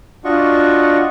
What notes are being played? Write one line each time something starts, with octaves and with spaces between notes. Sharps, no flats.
D4 F4 F#4 D#5 F#5 C#6